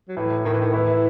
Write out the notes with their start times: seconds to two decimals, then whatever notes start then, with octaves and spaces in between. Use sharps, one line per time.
0.08 F#3
0.17 A2 E3
0.45 A2 D#3
0.53 E3
0.61 D#3
0.73 E3 E4